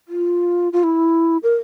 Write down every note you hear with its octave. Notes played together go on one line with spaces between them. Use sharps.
F4
F4
E4
A#4